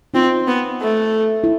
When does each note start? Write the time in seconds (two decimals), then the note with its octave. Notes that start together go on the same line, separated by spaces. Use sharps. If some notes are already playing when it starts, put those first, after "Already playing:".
0.14 C4 D#4 F4
0.48 B3
0.81 A3
1.44 E4